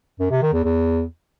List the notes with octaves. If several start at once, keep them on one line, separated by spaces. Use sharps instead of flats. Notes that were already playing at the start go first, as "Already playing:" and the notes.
F#2
C3
D#3
E2
E2